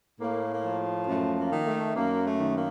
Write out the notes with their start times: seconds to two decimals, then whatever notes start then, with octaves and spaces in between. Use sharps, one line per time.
0.20 A2 A#3
0.50 A#3
0.64 F3
1.07 F#2 A3
1.37 A#3
1.52 D#3
1.67 A3
1.96 F#2 A#3
2.25 A3
2.39 D#3
2.55 A#3